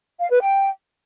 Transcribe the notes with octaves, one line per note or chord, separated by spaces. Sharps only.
F5
B4
G5